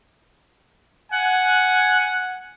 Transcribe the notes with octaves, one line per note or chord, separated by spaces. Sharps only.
F#5 G#5